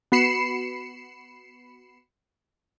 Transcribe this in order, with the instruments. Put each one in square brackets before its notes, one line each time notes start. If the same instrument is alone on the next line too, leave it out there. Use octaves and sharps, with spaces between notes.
[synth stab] B3 F#4 B5 C7 C#7 E7